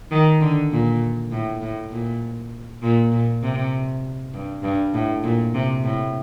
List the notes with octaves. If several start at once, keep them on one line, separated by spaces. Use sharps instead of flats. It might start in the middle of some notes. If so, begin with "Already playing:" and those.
D#3
D3
A#2
A2
A2
A#2
A#2
A#2
C3
G2
G2
A2
A#2
C3
A2